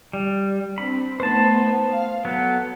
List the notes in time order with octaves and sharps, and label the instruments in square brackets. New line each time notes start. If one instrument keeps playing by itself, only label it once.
[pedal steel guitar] G3
[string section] C4 D4 [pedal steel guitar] B5
[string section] A3 B3 D#4 [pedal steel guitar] C5 A5
[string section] F5
[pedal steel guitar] F#3 B3 [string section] A4